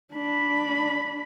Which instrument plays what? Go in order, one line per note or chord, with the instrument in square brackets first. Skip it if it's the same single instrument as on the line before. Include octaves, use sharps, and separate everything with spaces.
[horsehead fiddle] D4 B5